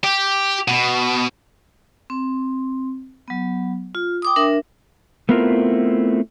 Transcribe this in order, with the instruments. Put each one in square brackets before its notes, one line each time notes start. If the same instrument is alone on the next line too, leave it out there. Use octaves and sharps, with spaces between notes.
[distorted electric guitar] G4
B2
[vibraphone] C4
F#3 B3
F4
G5 D6 D#6
D4 A#4 E5
[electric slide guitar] A3 B3 C4 E4 F4 A#4